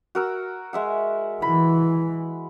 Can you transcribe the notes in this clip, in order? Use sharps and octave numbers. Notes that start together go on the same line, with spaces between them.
F#4 A#4 E6
G#3 E5 F#5
E3 B5